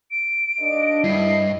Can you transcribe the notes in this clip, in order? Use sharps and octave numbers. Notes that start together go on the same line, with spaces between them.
D7
D#2 D4 D#5
G2 E4 C7